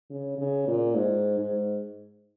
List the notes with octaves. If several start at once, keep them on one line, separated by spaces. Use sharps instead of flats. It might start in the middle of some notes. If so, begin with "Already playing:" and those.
C#3
C#3
A#2
G#2
G#2